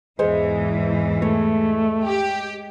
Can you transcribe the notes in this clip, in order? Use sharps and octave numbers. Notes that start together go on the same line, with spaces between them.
E2 G#2 E3 G#3 C5 C#5
A3 C#5
G4